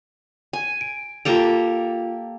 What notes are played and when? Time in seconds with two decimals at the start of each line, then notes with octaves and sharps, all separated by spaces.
0.53 G#5
0.81 D7
1.25 A#3 F4 G4 A4 F7